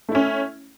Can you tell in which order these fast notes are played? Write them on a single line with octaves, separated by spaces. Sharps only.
A3 E4 C#4